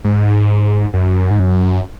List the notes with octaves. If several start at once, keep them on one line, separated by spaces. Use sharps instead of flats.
G#2
F#2
G#2
F#2